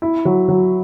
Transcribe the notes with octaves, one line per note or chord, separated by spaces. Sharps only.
E4
F#3
F#3